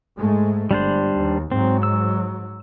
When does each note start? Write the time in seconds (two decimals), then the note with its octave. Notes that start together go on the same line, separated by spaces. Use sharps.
0.18 G#2 G#3 A3
0.71 G1 G3 D4 C5
1.17 D#2
1.52 G#2 F#3 C4
1.83 E6